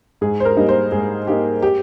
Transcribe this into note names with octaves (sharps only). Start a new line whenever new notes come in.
G#2 G#4
C5
A#4
G3 A#3 D#4
C5
G#2 G#4
G3 A#3 D#4 G4
G4